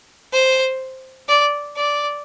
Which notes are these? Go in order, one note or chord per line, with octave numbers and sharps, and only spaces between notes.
C5
D5
D5